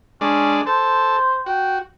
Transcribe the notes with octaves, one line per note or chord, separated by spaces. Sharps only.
G#3 C#4 D4
A4 C5
F#4 G5